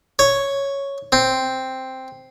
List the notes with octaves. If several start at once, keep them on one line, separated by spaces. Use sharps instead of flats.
C#5
C4